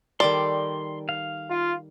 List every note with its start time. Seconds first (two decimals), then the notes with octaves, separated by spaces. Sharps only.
0.20 D#3 G3 A4 D5 C6
1.09 F5
1.50 F4